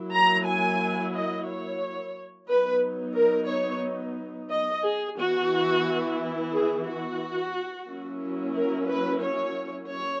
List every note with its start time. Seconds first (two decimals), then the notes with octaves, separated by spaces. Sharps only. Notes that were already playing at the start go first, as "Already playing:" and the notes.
Already playing: F#3 A#3 E4
0.12 A#5
0.46 G#5
1.14 D#5
1.47 C#5
2.48 F#3 B3 D#4 B4
3.16 A#4
3.49 C#5
4.50 D#5
4.83 G#4
5.17 E3 B3 E4 F#4
6.52 G#4
6.86 F#4
7.87 F#3 A#3 C#4 E4
8.54 A#4
8.88 B4
9.22 C#5
9.89 C#5